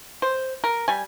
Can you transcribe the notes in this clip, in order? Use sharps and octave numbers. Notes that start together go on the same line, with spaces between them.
C5
A#4
G3 G#5